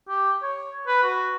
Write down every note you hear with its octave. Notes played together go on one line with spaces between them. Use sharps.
G4
C#5
B4
F#4